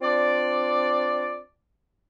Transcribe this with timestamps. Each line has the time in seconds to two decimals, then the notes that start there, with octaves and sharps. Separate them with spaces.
0.02 C4 D4 F4 D5